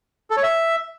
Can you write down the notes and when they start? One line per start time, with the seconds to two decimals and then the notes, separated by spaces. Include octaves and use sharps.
0.30 A4
0.37 C#5
0.43 E5